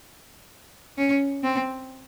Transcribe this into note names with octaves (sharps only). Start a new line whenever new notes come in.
C#4
C4